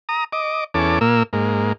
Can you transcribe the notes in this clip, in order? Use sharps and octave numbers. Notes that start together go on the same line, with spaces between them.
A#5 D#6
D#5 D6
E2 C#4 A4 D6
A#2 A#3 E6
G#2 A#3